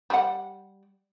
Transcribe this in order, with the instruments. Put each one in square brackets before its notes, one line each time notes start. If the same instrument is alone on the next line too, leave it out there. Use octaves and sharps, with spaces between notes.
[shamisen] G3 F#5